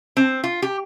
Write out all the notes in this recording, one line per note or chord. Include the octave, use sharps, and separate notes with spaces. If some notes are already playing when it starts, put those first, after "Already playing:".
C4
F4
G4